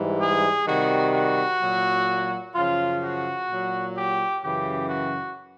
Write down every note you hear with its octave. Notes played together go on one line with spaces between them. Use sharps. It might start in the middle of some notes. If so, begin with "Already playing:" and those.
Already playing: G#2 E3 G3
G#4
C3 D#3 G3 F#4
F#4
A#2 F#3
F#2 C#3 F3 F4
F#4
A#2 F#3
G4
F#2 C#3 E3 G4
F#4